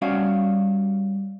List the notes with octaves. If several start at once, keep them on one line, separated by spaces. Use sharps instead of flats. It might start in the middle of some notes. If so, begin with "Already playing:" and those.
G3 C#4 F#4 F5